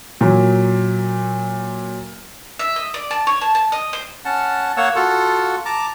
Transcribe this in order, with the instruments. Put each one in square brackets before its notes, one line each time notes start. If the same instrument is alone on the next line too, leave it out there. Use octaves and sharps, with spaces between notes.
[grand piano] A#2 F#3
[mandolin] E5
D#5
D5
A5
C#5
A5
A5
D#5
C5
[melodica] C#4 F#5 A5
A#3 C#5 F#5 E6
F4 F#4 A4 F#5
A5 A#5 D6